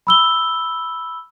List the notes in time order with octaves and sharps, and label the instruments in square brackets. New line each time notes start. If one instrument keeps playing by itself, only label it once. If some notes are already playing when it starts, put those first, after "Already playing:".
[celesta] B5 E6 G7